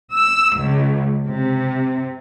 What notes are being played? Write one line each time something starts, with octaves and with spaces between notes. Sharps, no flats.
E6
C#2
C3